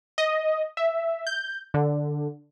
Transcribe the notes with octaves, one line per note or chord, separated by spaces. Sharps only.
D#5
E5
G6
D3